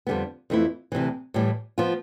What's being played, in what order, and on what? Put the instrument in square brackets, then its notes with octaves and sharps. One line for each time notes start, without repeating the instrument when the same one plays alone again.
[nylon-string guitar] F2 D3 G3 B3
F2 E3 A3 E4
D2 C3 E3
A2 E3 G3
F3 B3 F4